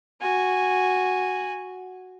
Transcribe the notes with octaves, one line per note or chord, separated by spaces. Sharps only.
F#4 G#5